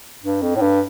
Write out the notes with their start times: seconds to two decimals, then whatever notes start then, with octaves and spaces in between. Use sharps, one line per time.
0.23 G2
0.42 F2
0.56 A2
0.61 G2